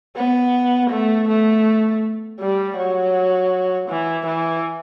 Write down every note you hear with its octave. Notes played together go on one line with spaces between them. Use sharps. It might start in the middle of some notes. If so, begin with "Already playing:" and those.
B3
A3
A3
G3
F#3
E3
E3